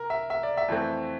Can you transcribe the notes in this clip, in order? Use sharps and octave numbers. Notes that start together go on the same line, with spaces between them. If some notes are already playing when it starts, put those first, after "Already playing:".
Already playing: C3 A#4
E5
E5
D5
E5
F2 E3 A3 C4